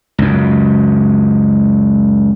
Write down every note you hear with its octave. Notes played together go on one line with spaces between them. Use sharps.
C#2 F#2